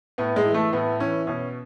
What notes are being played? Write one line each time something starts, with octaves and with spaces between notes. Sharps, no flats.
A2 B3
G#3
E3
A3
A2 B3
E3 C#4
B2 C#4